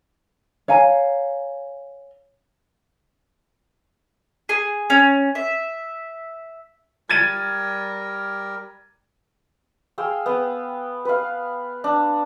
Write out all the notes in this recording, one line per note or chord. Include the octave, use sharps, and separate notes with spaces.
C#5 F5 G#5 A#5
G#4
C#4
E5
G3 A#4 G#6 A6 D#7
G#4 F5 G5 E6
B3 G5
B4 F5
D4